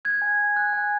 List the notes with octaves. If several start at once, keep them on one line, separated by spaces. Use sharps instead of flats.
F#6 G#6
G#5
G#5
F#6
G#5